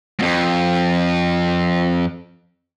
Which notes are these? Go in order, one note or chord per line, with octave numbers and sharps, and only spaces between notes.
F2 G#2